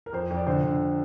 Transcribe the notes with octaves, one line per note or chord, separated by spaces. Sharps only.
A#4
F2 C5
F2
D5
D3 C5
D3